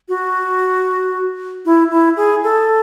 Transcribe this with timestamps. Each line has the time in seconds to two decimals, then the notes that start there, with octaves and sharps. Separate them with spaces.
0.09 F#4
1.66 E4
1.91 E4
2.17 G#4
2.44 A4